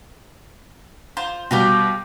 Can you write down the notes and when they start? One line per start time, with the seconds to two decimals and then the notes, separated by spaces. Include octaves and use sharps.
1.17 F4 C5
1.51 B2 G3 G4 F5 G5